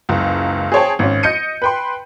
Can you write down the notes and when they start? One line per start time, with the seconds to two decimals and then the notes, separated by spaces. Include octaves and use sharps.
0.09 F#1 C#2
0.72 G#4 C5 C#5 G5 A5
0.99 G#1 C#4
1.23 D#5 G6 C#7 D#7
1.62 B4 G5 C6